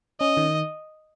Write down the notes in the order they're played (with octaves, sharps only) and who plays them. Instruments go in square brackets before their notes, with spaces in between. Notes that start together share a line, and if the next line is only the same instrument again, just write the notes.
[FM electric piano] C#4 [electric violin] D#5
[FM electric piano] D#3